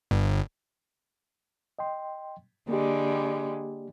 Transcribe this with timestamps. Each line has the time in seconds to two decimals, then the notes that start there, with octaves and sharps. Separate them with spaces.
0.11 G1
1.79 D#5 G5 C6
2.69 D3 G3 G#3 A#3 G4